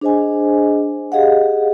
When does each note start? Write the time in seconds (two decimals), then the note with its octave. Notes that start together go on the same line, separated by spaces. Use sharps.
0.01 D4 G#4 C5 D#5 G#5
1.12 G4 G#4 D#5 F5 F#5